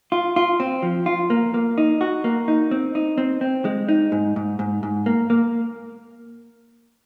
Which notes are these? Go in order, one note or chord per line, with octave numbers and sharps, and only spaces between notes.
F4
F4
C4
F3
F4
A#3
A#3
D#4
F#4
A#3
D#4
C4
D#4
C4
C4
G#3
D#4
G#2
G#2
G#2
G#2
A#3
A#3